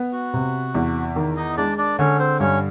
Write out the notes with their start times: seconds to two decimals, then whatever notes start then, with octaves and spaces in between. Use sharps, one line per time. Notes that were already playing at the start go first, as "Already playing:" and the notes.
Already playing: B3
0.12 F#4
0.33 C3
0.75 E2
1.16 D#3
1.37 D#4 D#5
1.57 G#3 D4 D5
1.78 D4 D5
1.99 D3 C#4 C#5
2.19 C4 C5
2.40 G2 C#4 C#5